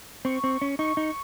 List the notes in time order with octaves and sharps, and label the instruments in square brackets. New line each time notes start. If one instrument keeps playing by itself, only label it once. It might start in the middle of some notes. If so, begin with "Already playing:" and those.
[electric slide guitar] C4 [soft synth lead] C#6
[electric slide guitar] C4
C#4
[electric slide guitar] D#4 [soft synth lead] C#6
[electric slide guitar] D#4